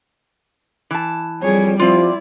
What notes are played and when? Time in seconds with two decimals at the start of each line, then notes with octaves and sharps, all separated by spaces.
0.91 E3 A5
1.43 F2 G3 G#4 C#5
1.80 F3 C4 E4 F4 D5